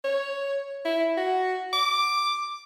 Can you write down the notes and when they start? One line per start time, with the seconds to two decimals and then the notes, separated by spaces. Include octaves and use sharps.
0.04 C#5
0.85 E4
1.17 F#4
1.73 D6